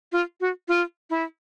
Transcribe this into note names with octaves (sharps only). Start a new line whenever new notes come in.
F4
F#4
F4
E4